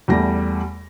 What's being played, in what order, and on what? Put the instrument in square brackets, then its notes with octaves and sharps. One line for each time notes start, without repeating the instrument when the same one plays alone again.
[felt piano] E2 G3 A3 A#6